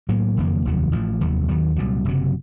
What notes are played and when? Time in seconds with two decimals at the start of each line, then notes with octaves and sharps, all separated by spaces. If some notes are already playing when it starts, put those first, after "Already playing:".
0.09 A2 F#3 A#3
0.37 F#1 F2 D#3 A#3
0.65 F1 D#2 D#3 F#3
0.92 A1 A2 F3
1.21 F1 D#2 D#3 F#3
1.49 D#2 D#3 F#3
1.76 C2 A#2 F#3
2.05 F#1 F2 C3 F#3